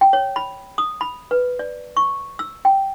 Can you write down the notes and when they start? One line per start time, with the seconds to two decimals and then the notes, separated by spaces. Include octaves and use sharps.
0.01 G5
0.13 C#5
0.36 B5
0.78 D#6
1.01 B5
1.31 B4
1.59 D5
1.97 C#6
2.39 E6
2.65 G5